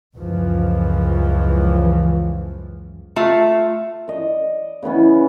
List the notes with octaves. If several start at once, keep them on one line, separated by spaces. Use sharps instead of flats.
C#2 F#2 E3 F3
A3 F4 E5
D5 D#5
C#3 E3 B3 C#4